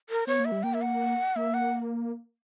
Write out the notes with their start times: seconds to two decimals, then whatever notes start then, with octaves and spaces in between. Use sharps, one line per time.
0.10 A#4
0.27 B3 C#5
0.39 A#3
0.45 E5
0.52 G3
0.63 A#3 G5
0.74 E5
0.82 F#5
1.36 A#3 E5
1.54 F#5